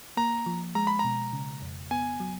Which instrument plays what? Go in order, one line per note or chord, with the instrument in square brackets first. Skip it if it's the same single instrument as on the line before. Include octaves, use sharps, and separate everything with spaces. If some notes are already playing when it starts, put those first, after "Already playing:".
[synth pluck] A#3 [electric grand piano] A#5
[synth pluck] F3
[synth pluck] G#3 [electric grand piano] A#5
[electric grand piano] B5
[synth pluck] B2 [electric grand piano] A#5
[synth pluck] C#3
F2
[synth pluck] B3 [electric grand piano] G#5
[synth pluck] F#3